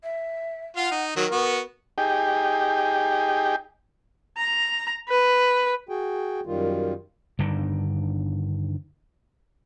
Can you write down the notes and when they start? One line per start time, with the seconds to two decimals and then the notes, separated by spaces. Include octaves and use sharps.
0.04 E5
0.77 F4 F5 F#5
0.91 D#4
1.16 D#3 F#3 A#4
1.31 B3 F#4
1.98 D#4 G4 G#4 G5
4.38 A#5
5.09 B4
5.89 F#4 G#4 G5
6.46 F#2 D#3 G3 F4
7.39 G2 D3 D#3